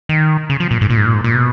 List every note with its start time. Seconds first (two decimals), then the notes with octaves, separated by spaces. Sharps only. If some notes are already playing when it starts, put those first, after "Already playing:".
0.09 D#3
0.50 C#3
0.60 F3
0.71 A#2
0.81 G#2
0.90 A#2
0.97 G#2
1.06 A#2
1.14 G#2
1.24 A#2
1.35 B2